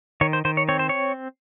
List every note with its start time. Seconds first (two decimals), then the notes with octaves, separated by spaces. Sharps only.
0.21 D#3 C#5
0.33 C5
0.45 D#3 C5
0.57 C#5
0.69 C4 C#5
0.79 C5
0.89 C#5